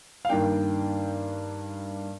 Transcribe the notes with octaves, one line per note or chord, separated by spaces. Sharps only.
F5
G2 D#3 A#3 D4 G5